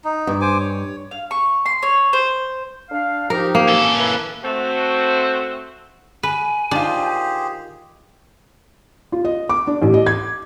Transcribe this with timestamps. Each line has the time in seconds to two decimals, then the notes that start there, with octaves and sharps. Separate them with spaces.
0.04 D#4
0.27 G2
0.41 C5 G#5 D6
0.60 C#5
1.11 F5
1.31 C#6
1.66 C6
1.83 C#5
2.13 C5
2.89 D4 F5
3.30 F3 D#4 G4 A#4
3.55 A#3
3.69 C#4 A4
3.96 E4 B4
4.43 A3 C4 F#4
6.23 B4 G#5
6.71 D#3 D4 F4 G4 G#4 C5
9.12 F4
9.25 D#5
9.49 D6
9.67 D4
9.82 A1
9.94 D#5
10.06 G#6